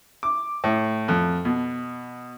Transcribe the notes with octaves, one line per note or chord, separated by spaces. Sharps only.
D6
A2
F2
B2